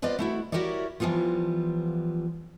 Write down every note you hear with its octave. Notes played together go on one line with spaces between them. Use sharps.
B3 F4 B4 C5 D5 D#5
A3 E4 F#4
E4 F#4 G4 A#4 C#5 D5
E3 F3 G3 B3 F4